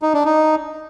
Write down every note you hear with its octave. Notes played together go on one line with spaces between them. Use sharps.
D#4
D4
D#4